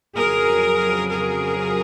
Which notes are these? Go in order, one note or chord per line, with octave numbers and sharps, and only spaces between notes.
F2 C#3 F#3 G#4 A#4
G#4 A#4